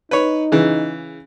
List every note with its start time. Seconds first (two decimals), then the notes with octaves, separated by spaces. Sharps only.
0.11 D#4 B4 C#5
0.52 C#3 E3